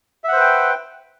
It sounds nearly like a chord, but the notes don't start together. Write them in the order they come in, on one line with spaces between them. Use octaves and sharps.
E5 F#5 C5 B4 G5